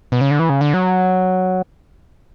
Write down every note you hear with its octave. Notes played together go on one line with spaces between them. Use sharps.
B2
C#3
D3
E3
C#3
D3
F#3